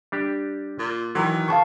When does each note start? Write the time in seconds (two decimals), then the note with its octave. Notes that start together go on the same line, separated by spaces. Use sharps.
0.12 G3 D4 G4
0.79 A#2
1.15 D#3 E3 F#3
1.48 C#2 F5 A5 C#6